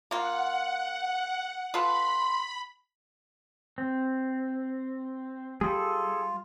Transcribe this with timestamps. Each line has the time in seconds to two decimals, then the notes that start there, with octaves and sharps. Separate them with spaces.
0.11 A#3 F4 F#5
1.74 F4 A4 B4 B5 C6
3.78 C4
5.61 G3 F4 G#4 A4